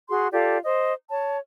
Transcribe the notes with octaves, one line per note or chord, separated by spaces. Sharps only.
F#4 G#4 C6
F4 G4 A4 D5
C5 D#5
C#5 A5